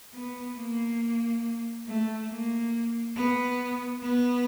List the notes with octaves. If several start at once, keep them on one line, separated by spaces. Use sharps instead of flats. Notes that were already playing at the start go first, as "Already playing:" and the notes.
B3
A#3
A3
A#3
B3
B3